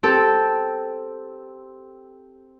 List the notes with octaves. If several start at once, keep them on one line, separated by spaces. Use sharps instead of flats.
C4 G4 A4